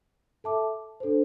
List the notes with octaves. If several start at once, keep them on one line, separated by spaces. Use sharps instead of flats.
A4 E5 A5 D6
D4 A4 C5